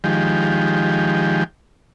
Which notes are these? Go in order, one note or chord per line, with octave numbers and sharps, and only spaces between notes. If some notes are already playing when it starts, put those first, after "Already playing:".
D#3 F3 G#3 G4